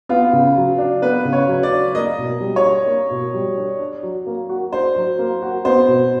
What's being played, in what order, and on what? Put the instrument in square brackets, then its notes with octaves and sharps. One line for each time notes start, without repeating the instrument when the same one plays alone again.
[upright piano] B3 [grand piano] F4
[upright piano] C#3
F#3
D4
[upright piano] B3 [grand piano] B4
[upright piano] C#3
[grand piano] C#5
[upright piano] F#3
[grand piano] D5
[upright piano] D4
[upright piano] A#3 [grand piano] D#5
[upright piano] B2
G3
[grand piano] C#5
[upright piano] D4
A#3
B2
G3
D4
D4
F#3
A#3
F#4
[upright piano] D4 [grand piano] C5
[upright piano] F#3
A#3
F#4
[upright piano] B3 [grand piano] C5
[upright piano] B2